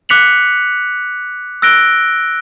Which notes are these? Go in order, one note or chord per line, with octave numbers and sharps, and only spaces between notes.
D6 F#6 B6 C#7 F7 F#7
E6 F#6 A#6 D7 G7